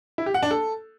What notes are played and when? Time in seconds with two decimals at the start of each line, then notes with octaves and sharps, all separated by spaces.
0.18 E4
0.26 G4
0.34 F#5
0.43 D4
0.51 A4